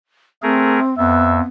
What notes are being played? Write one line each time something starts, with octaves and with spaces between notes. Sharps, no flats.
A3 C4 G#4 A#4
F2 B3 E5